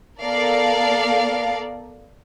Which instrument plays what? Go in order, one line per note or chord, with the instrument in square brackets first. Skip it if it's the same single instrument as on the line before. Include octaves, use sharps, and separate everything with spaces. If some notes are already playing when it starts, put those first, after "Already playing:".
[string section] B3 A4 A#4 D5 F5